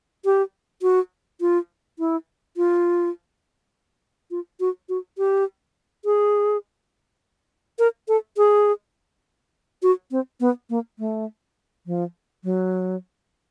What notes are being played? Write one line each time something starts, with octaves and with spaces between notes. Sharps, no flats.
G4
F#4
F4
E4
F4
F4
F#4
F#4
G4
G#4
A#4
A4
G#4
F#4
C4
B3
A#3
A3
F3
F#3